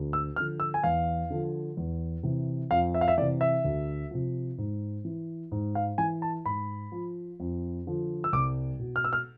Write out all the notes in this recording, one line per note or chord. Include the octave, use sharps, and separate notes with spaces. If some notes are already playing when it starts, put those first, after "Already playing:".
Already playing: D2
E6
D3 F3 F6
E6
G#5
E2 F5
D3 F3
E2
C3 E3
F2 F5
E5
F5
E5
C3 E3 D5
E5
D2
C3 F3
G#2
E3
G#2
F5
E3 G#5
A5
G#2 B5
F3
F2
D3 F3
E6
C2 D6
B2
F6
E6
F6